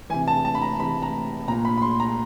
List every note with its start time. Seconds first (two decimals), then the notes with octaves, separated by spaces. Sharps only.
0.10 E3 G#5
0.13 C3
0.27 A5
0.45 A5
0.55 B5
0.62 A#5
0.79 C3 E3 B5
1.02 A#5
1.48 A#2 A#5
1.65 B5
1.78 B5
1.82 C6
2.00 A#5